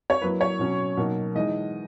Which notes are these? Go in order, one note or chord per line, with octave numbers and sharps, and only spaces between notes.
C#5
F#3 A#3 E4 B4
C#5
B2 F#3 C#4
B2 F#3 A#3 D#4
E3 G#3 D#4 D#5